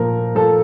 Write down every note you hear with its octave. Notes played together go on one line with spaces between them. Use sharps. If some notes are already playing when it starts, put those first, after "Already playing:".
Already playing: A#2 F3 A#4
F3 A4